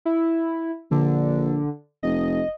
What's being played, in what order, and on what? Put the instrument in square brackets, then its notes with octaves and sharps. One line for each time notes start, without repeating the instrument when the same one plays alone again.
[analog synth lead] E4
[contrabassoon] A#1 [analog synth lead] D3
[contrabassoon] F1 [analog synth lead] D#5